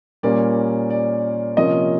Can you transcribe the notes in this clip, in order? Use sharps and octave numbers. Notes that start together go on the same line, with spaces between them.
A#2 G3 A#3 C#4 D5
D5
C3 F3 A#3 C#4 D#5